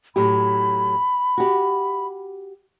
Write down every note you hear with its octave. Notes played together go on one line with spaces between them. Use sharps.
A2 F#3 G4 B5
F#4 G4